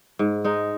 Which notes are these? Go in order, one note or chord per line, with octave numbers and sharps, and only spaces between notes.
G#2
G#3 D#4